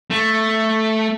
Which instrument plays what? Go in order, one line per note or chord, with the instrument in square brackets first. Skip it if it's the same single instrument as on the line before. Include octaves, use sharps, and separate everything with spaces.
[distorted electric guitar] A3